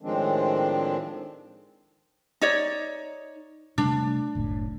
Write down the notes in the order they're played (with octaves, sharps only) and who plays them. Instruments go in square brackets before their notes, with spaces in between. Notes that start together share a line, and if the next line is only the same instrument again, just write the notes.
[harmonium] A2 D#3 F3 G#3 C4 D4
[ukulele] D#4 C#5 D5
[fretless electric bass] C3 G3 A3 [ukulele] D4
[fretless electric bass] F#1 C#2 A2